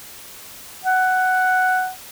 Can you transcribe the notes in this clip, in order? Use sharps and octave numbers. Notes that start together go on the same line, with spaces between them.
F#5